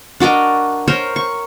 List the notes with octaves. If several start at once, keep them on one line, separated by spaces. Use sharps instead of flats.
D4 F#4 A#4 D#5
A#4 C5 C#5
C#6